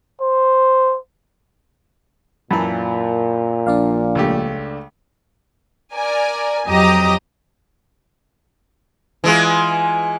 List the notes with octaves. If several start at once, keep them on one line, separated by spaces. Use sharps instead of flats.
C5
F#2 A#2 E3 A#4 A5 B5
A#1 D4 D5 F5
C#2 A3 G4
A#4 D5 G#5
F2 F#3 G4 D#5 A#5 D#6
E3 G#3 F4